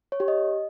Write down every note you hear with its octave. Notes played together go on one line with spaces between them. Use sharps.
C#5
G4
D#5